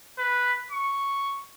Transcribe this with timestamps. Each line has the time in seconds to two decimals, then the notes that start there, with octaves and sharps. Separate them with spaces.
0.19 B4
0.72 C#6